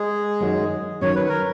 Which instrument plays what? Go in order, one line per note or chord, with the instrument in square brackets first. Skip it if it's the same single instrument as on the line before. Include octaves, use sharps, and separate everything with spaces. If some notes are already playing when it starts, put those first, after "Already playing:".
Already playing: [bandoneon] G#3 G#4
[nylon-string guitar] F#2 D#3 F#3 C#4 F#4
[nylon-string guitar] D#3 F#3 C#4 [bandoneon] C#5
[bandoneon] B4
A#4